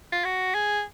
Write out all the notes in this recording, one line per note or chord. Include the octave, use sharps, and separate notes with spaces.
F4
F#4
G#4